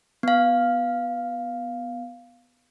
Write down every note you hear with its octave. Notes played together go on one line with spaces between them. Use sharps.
B3 F5